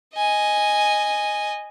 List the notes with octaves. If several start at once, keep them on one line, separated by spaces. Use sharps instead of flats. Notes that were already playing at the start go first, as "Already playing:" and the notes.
D#5 G#5